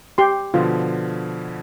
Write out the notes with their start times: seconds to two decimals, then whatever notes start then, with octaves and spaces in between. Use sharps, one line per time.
0.18 G4 C6
0.54 B2 D3 F3 F4